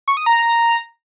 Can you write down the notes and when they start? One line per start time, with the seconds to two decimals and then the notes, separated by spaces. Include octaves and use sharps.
0.08 C#6
0.17 D#6
0.26 A#5